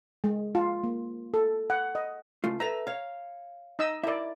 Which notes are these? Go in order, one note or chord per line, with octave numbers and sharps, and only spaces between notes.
G#3
F4
A#3
A4
F#5
D#5
C#2 A3 F4
A4 B4 E5 A#5
C#5 F5
D#4 D#5 E6
E4 A#4 D5 E5